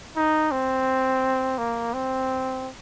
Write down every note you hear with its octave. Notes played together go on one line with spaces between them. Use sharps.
D#4
C4
A#3
C4